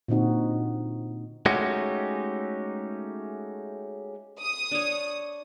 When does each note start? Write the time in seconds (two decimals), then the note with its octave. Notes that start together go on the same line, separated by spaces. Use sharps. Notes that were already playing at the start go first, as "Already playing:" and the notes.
0.08 A#2 D3 C4 D#4 F#4
1.46 G#3 A3 C#4 D#4 F#4 G4
4.41 D#6
4.71 D4 C#5